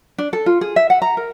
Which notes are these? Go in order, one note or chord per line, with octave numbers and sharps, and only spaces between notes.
D4
A4
F4
G#4
E5
F#5
A#5
A#4